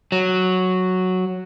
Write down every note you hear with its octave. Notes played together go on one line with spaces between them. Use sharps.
F#3